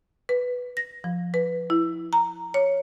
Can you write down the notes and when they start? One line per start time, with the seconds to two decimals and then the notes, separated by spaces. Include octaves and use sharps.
0.29 B4
0.77 A#6
1.04 F3
1.34 B4
1.70 E4
2.13 A#5
2.54 C#5